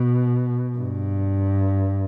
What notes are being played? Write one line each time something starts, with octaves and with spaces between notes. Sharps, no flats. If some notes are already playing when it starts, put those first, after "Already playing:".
Already playing: B2
G2